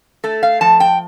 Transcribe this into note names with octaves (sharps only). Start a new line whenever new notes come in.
A3 A4
F5
F3 A5
G5